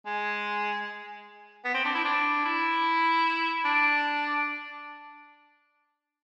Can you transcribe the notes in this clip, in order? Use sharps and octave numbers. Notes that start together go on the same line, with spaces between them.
G#3
B3
C4
D4
E4
D4
E4
D4